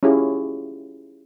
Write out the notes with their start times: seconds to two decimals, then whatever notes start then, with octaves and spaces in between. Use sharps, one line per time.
0.03 C#4 E4 F4 G4 G#4